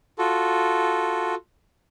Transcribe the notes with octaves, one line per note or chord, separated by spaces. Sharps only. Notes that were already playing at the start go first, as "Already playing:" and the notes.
F4 F#4 A4